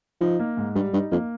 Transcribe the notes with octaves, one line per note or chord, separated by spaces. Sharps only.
F3 D#4
A#3
G#2
G2 G3
G2 D#4
F2 A#3